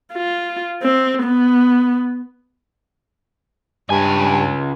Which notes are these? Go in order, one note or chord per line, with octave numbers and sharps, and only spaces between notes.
F4
C4
B3
C#2 G2 G#5